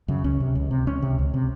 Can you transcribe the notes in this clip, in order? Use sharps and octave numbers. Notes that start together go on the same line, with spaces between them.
F#2 C#3
C#2 C#4
C3
C#2
C3
C#2 C#4
C3
C#2
C3